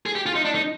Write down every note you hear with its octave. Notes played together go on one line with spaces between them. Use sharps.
G#4
G4
F4
D#4
D4
D#4